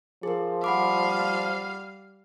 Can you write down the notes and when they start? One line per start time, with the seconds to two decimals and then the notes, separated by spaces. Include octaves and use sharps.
0.23 F3 G#4 A#4
0.64 G3 F5 F#5 B5 D6